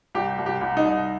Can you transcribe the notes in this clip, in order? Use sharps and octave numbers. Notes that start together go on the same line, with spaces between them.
C2 G4
C2
G4
C2
D#4
C2